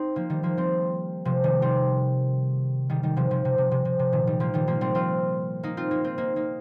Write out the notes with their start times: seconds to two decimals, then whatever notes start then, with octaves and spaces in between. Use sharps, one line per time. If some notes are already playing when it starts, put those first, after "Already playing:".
Already playing: C4 D#4
0.16 F3 A#3
0.30 D#3 G3
0.43 F3 A#3
0.57 G3 C4
1.25 C3 F3
1.44 D#3 G3
1.62 G3 C4
2.89 D#3 G3
3.03 D#3 G3
3.17 C3 F3
3.31 C3 F3
3.45 C3
3.58 C3
3.71 C3
3.85 C3
3.99 C3
4.12 A#2 D#3
4.27 D#3 G3
4.40 F3 A#3
4.54 D#3 G3
4.67 F3 A#3
4.81 G3 C4
4.95 C4 F4
5.63 A#3 D#4
5.77 C4 F4
5.91 A#3 D#4
6.04 C4 F4
6.18 A#3 D#4
6.36 A#3 D#4